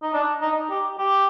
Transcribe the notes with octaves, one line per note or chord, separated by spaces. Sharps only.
D#4
D4
D#4
G4
G4